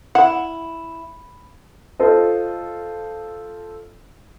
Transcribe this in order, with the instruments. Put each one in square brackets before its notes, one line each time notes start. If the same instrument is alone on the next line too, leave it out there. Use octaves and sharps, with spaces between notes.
[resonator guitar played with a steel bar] E4 [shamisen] F#5
[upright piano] F4 A4 C5 D#5